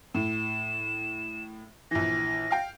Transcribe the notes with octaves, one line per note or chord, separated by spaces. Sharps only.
A2 E7
A#1 E3 A#6
F5 G5